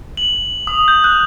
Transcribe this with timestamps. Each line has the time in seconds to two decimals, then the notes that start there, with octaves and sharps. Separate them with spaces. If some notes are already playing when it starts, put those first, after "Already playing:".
0.17 F#7
0.67 D#6
0.88 G6
1.04 F#6